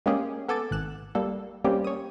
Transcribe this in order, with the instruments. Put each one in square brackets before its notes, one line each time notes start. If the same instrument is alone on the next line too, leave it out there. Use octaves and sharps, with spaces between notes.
[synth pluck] G#3 A#3 C#4 G4 G#4
B3 A4 G#5 D6 A6
G#1 F#6 E7
G3 A#3 A4
G3 A#3 C4 C#4 G4
C#5 D#6